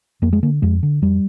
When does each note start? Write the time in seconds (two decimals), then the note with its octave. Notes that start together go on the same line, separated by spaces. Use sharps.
0.22 F2 A#3
0.33 G#3
0.43 D3 A#3
0.62 F2 G#3
0.83 D3
1.02 F2 G3